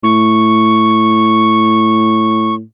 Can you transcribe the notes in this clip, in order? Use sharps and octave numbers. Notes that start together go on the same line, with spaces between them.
A2 C#6